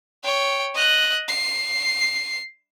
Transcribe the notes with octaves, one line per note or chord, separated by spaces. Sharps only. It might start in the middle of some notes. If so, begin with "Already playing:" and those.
C#5 G5
D#5 F#6
C7